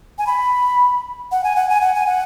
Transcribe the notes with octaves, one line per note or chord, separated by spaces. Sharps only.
G#5
B5
F#5
G#5
F#5
G#5
F#5
G#5
F#5